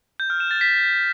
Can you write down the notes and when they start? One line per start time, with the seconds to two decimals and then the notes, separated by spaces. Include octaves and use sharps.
0.20 G6
0.30 F6
0.40 E7
0.51 A6
0.61 B6